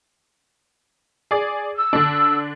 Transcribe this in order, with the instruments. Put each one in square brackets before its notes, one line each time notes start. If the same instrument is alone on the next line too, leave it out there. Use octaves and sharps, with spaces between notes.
[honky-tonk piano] G#4 D5
[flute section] E6
[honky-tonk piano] D3 D4